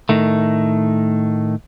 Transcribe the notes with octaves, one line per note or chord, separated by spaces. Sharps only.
A2 D#3 A3